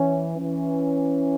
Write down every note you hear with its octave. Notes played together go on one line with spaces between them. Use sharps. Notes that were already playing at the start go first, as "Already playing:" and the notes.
Already playing: E3 C#4
E3 C#4